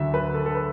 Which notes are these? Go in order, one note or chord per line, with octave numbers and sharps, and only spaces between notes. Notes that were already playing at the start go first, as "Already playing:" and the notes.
Already playing: D2 D3 F#3 E5
B4
A4
A4
B4